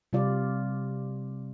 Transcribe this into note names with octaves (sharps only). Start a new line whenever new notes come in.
C3 G3 F4 D5